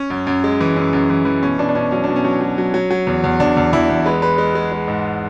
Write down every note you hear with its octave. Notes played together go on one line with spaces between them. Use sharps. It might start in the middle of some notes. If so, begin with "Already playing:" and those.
Already playing: C#4
F#2
F#2
G#3
E3
F#2
F#2
E3
E3
B2 C#4
B2 D4
D4
B2 C#4
F#3 C#4
B2 D4
C#4
F#3
F#3
F#3
F#3
F#3
E2
E2
E2 D4
E2
E2 E4
E2
G#3 B4
G#3 B4
G#3
G#3
G#3
G#2